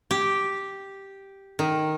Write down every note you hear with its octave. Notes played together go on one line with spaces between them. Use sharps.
G4
D#3